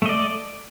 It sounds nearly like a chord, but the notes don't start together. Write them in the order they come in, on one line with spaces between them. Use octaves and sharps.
A3 D#5 D5